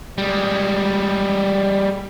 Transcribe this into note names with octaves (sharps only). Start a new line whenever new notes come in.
G3 G#3